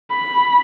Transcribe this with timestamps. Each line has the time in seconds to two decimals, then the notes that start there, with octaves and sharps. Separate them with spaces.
0.11 B5